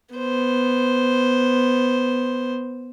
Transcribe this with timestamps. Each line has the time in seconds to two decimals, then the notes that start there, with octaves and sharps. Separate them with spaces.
0.15 B3 C5